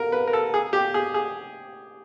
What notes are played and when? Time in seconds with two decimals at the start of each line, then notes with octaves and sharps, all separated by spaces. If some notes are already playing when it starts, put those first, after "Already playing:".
Already playing: A#4
0.12 B4
0.27 A#4
0.33 A4
0.54 G#4
0.73 G4
0.94 G#4
1.14 G#4